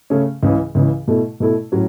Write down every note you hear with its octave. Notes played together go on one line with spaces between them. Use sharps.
C#3 A3 C#4
C#2 C#3 E3
C#2 C#3 E3
B2 A3 E4 A4
B2 A3 E4 A4
A2 F#3 C#4